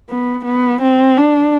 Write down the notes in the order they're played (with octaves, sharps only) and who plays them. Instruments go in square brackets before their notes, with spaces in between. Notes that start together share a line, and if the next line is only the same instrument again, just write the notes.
[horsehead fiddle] B3
B3
C4
D4